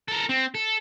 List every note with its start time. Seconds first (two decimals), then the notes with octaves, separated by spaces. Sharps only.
0.08 A4 A#4
0.29 C4
0.55 A4